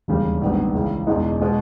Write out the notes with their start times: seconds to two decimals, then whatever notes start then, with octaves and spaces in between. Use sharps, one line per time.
0.08 E1 D#2 C#3 G3
0.42 A#1 G#2 D#3 G3 B3
0.74 C#2 C#3 E3
1.07 E1 E2 B2 G#3 D#4
1.41 B2 G#3 B3